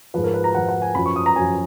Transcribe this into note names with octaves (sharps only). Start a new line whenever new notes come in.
G#2 F3 B4
A#4
B4
A#5
G#2 F3 F#5
F#5
G#5
F#2 F3 B5
C#6
D#6
A#5
F#2 G#5
F3